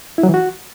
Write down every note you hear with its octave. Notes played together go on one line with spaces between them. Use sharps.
E4
F#3
E3
F#4